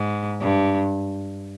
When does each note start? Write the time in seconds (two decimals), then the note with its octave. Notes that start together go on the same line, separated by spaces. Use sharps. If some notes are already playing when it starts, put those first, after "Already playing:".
Already playing: G#2
0.41 G2